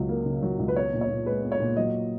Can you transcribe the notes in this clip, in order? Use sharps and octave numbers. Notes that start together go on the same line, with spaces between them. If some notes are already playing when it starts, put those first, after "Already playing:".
Already playing: C#2 F#3
A#3
C#3
F#3
C#2
B4
B3 C#5
A#2
C#5
A#2
G#3 B4
B3
C#5
A#2
F#3 D#5